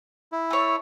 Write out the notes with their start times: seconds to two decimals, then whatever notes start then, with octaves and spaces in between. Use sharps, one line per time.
0.32 E4
0.51 A3 C#5